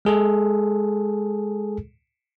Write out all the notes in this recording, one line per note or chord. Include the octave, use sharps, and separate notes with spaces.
G#3 G#4 A4